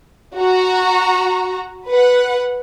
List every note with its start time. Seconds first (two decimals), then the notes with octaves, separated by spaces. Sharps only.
0.37 F#4 A#5
1.87 B4 F#5